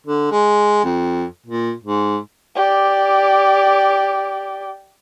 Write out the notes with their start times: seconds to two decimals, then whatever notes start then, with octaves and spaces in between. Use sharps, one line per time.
0.07 D3
0.31 G#3
0.84 F2
1.46 A#2
1.84 G#2
2.56 G4 D5